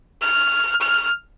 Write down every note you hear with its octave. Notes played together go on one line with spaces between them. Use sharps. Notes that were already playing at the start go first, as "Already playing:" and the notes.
F6
F6